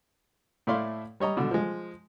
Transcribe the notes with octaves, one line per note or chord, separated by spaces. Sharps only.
A2 A3 E4 D5 F5 C6
G3 C#5 D#5 A#5
B2 D3
F3 G#3